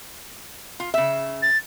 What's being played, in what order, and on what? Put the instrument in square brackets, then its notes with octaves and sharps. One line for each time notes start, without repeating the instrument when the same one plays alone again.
[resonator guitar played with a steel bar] F4
C#3 E5
[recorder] A6